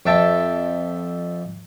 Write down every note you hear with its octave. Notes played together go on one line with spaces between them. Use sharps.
F2 E5 G5 A5